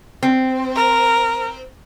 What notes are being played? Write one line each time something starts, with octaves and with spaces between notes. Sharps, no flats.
C4
A#4